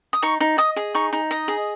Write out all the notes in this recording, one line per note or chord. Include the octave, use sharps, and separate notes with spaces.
D#6
D#4 C#6
D#4
D#5 D#6
G#4
D#4 C#6
D#4
D#5
G#4